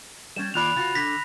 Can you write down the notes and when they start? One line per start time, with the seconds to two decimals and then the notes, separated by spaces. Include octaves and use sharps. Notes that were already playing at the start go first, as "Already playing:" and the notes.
0.36 G3 C#4 E7
0.54 D#2 F4 D5 B5 F#6 F7
0.75 C#3 F4 F#4
0.95 D3 A#6 B6